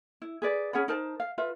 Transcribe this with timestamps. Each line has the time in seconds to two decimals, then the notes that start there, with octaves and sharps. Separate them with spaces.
0.22 E4
0.42 G#4 B4 D5
0.73 C#4 G#4 F#5 B5
0.88 D#4 A#4 C5 A5
1.20 F5
1.38 F4 B4 E5